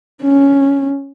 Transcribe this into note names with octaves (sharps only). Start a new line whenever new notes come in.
C#4